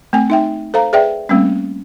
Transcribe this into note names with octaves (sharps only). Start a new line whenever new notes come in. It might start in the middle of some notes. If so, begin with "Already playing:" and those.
A3 C4 G#5
D#4 E5 G5
A4 C5 F5 A#5
G#4 B4 D5 E5 G5
G3 A3 A#3 C4 C#4